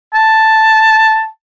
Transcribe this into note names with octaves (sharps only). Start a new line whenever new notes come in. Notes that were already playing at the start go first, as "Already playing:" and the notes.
A5